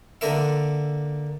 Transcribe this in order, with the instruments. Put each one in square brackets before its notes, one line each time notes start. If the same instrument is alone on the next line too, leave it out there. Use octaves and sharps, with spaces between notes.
[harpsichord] D3 A#3 A#4 E5